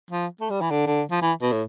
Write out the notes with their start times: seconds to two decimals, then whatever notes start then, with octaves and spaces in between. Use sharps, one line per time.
0.11 F3
0.41 A3
0.50 G3
0.61 E3
0.71 D3
0.87 D3
1.11 F3
1.22 E3
1.42 B2
1.52 A2